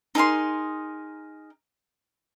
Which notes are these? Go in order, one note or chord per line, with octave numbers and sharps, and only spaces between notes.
D#4 G#4 A#4 C6